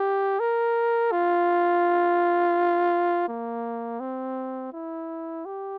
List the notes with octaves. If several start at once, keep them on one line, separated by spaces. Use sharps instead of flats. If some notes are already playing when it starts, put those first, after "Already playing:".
Already playing: G4
A#4
F4
A#3
C4
E4
G4